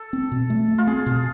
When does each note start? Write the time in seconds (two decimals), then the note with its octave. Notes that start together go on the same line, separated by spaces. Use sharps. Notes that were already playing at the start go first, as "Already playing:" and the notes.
Already playing: A4
0.13 C4
0.32 B2
0.50 A3
0.68 A3
0.78 F4
0.87 C4 G#4
1.06 B2